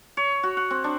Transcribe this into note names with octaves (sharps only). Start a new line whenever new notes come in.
C#5
F#4
F#5
C4
D4